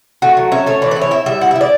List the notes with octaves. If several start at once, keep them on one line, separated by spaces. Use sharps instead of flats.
A3 F#4
F#3
C#4 E5
A3 C#5
E3 D5
B4
E4
C#5
E4 E5
G3 E5
E4 F#5
E5
E4
D5